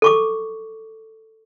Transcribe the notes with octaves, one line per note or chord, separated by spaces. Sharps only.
A4 C#6 D6